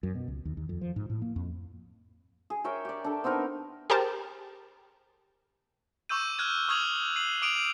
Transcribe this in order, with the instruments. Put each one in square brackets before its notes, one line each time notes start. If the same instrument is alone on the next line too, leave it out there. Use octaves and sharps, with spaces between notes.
[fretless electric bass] F#2
B2
C#2
D#2
D#2
F2
F3
G#2
A2
A#3
F2
[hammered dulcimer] G#4
A#4 C#5 E5 G5
G4 D5
D4 A4
B3 C4 D#4 A#4
[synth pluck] G4 G#4 A#4 C5 A5
[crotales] C#6 D6 E6 G6 D#7
F6 F#6 G#6
C#6 D#6 F6 G#6 F7 F#7
C7 D#7 F#7
D6 D#6 D7 D#7 F7